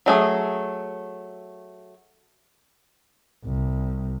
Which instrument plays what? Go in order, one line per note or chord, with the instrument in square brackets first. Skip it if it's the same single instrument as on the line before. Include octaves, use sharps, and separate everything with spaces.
[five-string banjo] F#3 A3 G#4
[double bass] C2